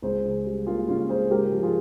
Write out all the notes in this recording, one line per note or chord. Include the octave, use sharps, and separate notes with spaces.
C#2 G#4 C5
C#3
G3
A#3 F4 G#4
C#2 C#4 F4
C#3 G#4 C5
G#2 G4 A#4
F3
F4 G#4